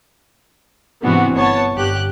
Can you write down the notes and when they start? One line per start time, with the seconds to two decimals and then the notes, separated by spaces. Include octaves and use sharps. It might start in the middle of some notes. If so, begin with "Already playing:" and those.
1.03 G#2 C3 E3 B3 D4 F#4
1.33 G1 B3 C#5 A5
1.75 G1 G4 F#6